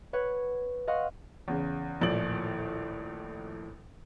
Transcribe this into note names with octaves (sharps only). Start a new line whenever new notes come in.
B4 C#5 F#5
D#5 F5 F#5 C6 C#6
E2 C#3
D#1 A#1 A2 D5 F#7